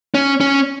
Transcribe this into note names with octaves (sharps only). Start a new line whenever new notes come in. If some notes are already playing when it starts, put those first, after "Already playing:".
C#4
C#4